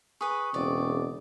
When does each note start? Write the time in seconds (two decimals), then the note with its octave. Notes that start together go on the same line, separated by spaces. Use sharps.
0.21 G#4 B4 C#6 D#6
0.54 E1 C#3 C4 D5